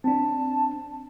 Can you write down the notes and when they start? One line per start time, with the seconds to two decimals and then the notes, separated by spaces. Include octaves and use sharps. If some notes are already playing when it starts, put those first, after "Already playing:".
0.04 C4 D4 A5